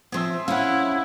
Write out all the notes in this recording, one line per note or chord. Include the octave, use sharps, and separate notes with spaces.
F3 C4 G#4 C5 E5
C#4 E4 C#5 F5 F#5